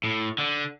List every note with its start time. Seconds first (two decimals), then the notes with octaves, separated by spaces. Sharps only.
0.04 A2
0.39 D3